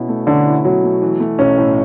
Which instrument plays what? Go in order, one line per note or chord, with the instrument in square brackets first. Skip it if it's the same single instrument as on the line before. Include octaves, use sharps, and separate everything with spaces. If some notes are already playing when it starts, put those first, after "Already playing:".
Already playing: [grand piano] B2 C#4 E4
A3
[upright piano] D3 [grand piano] C#4
[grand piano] E4
[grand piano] B2 [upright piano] F#3
[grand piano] A3
E3
A3
[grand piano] B1 [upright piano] C#4
[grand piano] A2